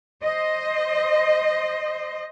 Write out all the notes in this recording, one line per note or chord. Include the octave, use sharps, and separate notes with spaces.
C5 D#5